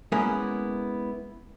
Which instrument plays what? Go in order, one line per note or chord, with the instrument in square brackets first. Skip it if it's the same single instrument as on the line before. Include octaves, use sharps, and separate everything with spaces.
[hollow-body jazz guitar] G#3 A#3 B3 C#4 E4 A#4